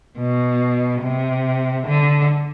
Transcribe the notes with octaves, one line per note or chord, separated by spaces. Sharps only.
B2
C3
D3